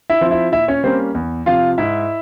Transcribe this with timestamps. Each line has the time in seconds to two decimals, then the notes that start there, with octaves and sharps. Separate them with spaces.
0.10 E4 E5
0.21 F3 C4
0.31 E4 E5
0.52 A#2 E4 E5
0.68 C#4 C#5
0.83 G3 A#3 C4 C#4 C5
1.15 E2
1.46 C3 F3 F4 F5
1.78 G#2 E4 E5